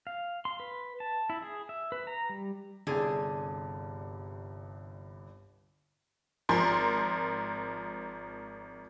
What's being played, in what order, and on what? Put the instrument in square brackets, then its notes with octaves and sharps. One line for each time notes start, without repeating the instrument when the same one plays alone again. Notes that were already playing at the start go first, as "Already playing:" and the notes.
[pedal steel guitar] F5
C6
B4
A5
E4
G#4
E5
B4
A#5
G3
[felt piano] G1 C2 G2 [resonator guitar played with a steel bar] D3 [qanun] G#4
[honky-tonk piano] G#1 F3 A#4 C6